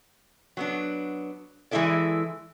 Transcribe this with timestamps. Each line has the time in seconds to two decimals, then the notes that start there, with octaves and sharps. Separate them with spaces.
0.57 F#3 B3 D4
1.71 E3 G#3 C#4 E4 A4 D5